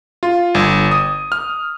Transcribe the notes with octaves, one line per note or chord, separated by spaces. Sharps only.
F4
G1
D#6
F6